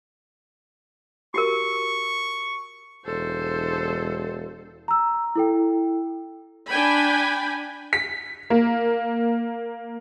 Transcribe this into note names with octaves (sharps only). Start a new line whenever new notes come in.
F#4 G4 A#4 C#6
E1 A4 C5
A#5 E6
E4 A4 G5
D4 G5 G#5 B5
B6
A#3